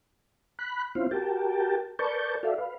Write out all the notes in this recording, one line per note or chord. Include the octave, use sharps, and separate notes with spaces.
B5 F#6
C4 C#4 E4 F4 C5 F5
F#4 G4 A#4 G5 A5
A#4 B4 D5 A5 C#6 G6
F#4 A4 D5 E5 F5
B4 F5